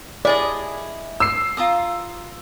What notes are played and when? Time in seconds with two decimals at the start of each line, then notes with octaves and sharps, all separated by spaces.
0.25 E4 G#4 D5 D#5
1.20 E6 C7
1.57 F4 A#5 D#6